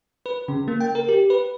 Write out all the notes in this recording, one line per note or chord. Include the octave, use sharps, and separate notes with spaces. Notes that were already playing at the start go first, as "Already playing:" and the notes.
B4
C#3
A#3
G5
A#4
G4
B4